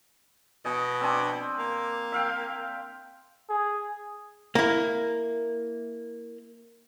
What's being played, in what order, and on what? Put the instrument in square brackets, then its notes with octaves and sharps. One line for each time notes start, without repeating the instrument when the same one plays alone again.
[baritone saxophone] B2 [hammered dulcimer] D#5 G#5
[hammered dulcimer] C4 D4 G#5
[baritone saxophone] A#3
[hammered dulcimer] E5 F5 G5
[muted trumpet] G#4
[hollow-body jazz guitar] A#3 E4